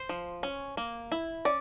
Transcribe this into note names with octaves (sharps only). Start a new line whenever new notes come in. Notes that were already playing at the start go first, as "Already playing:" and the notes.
Already playing: C5
F3
C#4
A#3
E4
C#4 D5